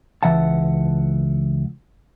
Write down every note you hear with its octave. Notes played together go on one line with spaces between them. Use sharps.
C#2 E3 E5 F#5 A5